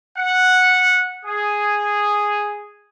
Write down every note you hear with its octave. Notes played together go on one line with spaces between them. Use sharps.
F#5
G#4